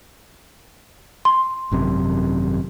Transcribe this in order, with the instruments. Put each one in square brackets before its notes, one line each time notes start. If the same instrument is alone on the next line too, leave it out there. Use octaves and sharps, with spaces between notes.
[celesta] C6
[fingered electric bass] G#1 F#2 C3